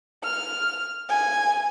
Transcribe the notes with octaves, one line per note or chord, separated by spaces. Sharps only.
F6
G#5